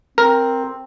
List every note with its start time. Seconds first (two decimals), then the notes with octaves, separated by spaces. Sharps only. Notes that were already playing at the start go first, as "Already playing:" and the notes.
0.18 C4 A#4